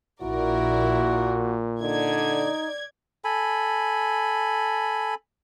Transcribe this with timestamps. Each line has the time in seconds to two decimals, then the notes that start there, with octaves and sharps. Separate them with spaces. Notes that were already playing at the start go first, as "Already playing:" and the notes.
0.22 A#1 A#2 E4 F#4 A#4 D5
1.81 D3 D#4 D5 G#6
3.24 A4 G#5 B5